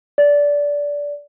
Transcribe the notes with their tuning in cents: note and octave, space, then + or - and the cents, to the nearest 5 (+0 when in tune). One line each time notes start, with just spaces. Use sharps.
D5 -15